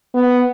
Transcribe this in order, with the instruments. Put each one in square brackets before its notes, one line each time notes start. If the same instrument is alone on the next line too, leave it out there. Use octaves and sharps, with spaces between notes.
[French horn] B3